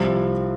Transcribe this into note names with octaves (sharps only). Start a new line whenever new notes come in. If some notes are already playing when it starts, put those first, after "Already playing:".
Already playing: C2 C3 F3